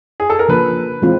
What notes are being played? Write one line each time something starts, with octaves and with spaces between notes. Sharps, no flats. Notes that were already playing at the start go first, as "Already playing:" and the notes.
G#4
A4
A#4
C#3 F3 A#3 D4 B4
E3 G#3 C4 F4